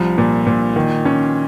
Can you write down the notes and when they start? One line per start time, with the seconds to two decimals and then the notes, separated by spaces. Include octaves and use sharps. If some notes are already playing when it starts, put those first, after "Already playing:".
Already playing: C2 F3
0.18 A#2
0.47 A#2
0.76 D#3
1.05 C#4